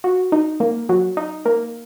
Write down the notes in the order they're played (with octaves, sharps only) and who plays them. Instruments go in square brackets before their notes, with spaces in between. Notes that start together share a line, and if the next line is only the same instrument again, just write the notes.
[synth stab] F#4
D#4
A#3
F#3
D#4
A#3